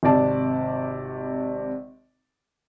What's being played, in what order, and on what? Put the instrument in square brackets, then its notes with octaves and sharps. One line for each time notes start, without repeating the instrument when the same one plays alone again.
[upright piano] G#1 C3 D5 A5